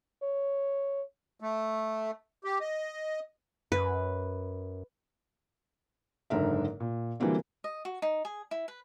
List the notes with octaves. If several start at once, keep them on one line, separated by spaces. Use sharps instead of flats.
C#5
A3
G4
D#5
F#2 B4
F#1 G#2 D3 A#4 E5
A#2
D3 E3 F#3 G3 A#3 C4
D#5
F#4
D#4
G#4
E4
B4